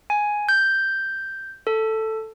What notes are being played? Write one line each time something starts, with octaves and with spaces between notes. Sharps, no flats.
G#5
G6
A4